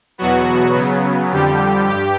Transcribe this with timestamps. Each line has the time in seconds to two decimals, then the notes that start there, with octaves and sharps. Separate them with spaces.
0.18 E2 B2 F#3 B3 F#4
0.75 C#3 F#3 B3
1.31 F2 D3 G3 G4
1.88 G2 G4